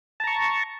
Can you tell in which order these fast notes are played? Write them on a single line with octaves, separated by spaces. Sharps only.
A5 A#5 C#6